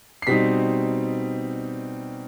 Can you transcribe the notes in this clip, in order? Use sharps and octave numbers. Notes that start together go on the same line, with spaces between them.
C7
B2 G3 C4 D#4 B6